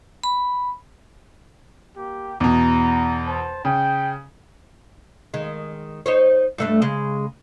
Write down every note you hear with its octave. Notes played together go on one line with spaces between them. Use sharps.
B5
A#3 G4
E2 B2 A#5
C5 A5
C#3 G5
D#3 G#3
D#4 C5 C#5
G2 A3 D4
C#3 G#3